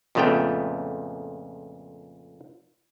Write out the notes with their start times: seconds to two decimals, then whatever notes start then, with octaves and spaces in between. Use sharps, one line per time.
0.15 F2 A#2 C#3 A3 B3 G5